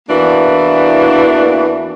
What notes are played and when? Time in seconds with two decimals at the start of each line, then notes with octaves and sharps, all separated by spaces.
0.09 E2 E3 A#3 D4 F#4